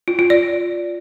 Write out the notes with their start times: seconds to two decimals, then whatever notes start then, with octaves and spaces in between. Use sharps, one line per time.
0.08 F4
0.19 F4
0.30 D5